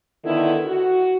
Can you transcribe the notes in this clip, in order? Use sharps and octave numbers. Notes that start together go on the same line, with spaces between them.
D3 D#3 B3 E4
F#4